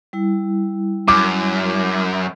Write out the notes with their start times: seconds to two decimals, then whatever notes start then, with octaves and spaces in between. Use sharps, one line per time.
0.13 G3 E4
1.08 F#2 D6